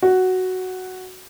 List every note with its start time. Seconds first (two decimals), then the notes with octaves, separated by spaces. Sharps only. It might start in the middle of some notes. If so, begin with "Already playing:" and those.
0.02 F#4